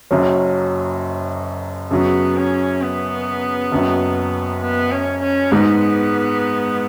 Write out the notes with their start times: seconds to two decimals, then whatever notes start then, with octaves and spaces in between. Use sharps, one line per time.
0.11 F#1 F#2 F#3 C#4
1.91 F#2 C#3 F#3 B3
2.36 C#4
2.82 B3
3.71 F#1 F#2 F#3
4.61 B3
4.91 C#4
5.22 C#4
5.52 G#2 G#3 B3 D#4